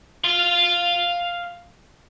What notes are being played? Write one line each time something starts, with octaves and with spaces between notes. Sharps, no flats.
F5 C6